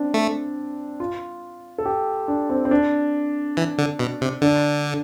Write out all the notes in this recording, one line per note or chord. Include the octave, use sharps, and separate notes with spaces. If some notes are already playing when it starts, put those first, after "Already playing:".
Already playing: C4 D4
A3
F4
A4
G4
D4
C4
C4
D4
E3
D3
B2
C3
D3 D4